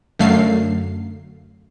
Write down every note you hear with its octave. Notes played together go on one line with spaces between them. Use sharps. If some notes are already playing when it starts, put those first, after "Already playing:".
F#2 D3 F#3 A3 F5 C7